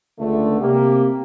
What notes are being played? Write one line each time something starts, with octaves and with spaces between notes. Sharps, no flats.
C#2 D3 A3
C3 A#3 G4